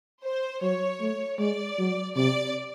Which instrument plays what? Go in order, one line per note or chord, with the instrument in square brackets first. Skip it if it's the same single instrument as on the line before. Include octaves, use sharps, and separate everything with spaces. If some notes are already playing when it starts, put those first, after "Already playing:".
[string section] C5
[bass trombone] F#3 [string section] C#5
[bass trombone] A3
[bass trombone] G#3 [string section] D5
[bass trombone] F#3
[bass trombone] C3 [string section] D5